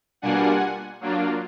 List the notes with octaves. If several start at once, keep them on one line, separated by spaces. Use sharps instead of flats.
B2 G3 A#3 D4 F4 F#5 G#5
F#3 A#3 D4 F4